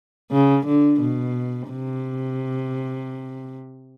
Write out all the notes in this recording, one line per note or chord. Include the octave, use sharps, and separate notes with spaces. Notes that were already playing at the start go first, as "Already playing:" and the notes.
C#3
D3
B2
C3